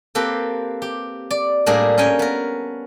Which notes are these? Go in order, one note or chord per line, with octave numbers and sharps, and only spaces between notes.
A#3 C4 G4 A4 B4
G4
D5
A2 G3 A#3 D4 G#4
C#4 A#4 G5 G#5
B3 A#4